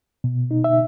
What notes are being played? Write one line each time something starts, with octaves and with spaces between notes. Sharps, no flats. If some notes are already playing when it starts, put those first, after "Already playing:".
B2
D#4
E5